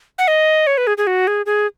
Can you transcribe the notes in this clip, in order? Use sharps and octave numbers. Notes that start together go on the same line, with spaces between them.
F#5
D#5
C#5
B4
G#4
G#4
F#4
G#4
G#4